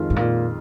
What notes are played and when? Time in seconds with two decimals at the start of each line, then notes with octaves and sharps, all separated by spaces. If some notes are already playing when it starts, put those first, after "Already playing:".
Already playing: F2 D#3 G#3 F4
0.10 G#2
0.16 A#2